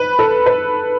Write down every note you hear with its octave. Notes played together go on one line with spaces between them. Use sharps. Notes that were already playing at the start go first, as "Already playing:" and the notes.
Already playing: B4
A4
B4